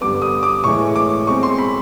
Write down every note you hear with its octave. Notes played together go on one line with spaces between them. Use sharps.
G2 D3 G3 B3 D6
D#6
D6
A2 E3 G#3 C#6
D6
B2 G#3 C4 C#6
C6
B5